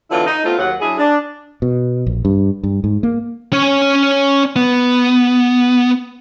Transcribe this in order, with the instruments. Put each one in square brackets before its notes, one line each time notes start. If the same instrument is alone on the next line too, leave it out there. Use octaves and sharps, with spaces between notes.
[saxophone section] D3 E3 F#3 B3 E4 F4
D#4
A3 B3 C4 F4
D#2 F#3 F#5
F#3 D4 E4 G#4
D4
[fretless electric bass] B2
A#1
G2
G2
G#2
A#3
[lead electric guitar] C#4 C#5
B3